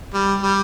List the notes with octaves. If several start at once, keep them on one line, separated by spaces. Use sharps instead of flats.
G3
G3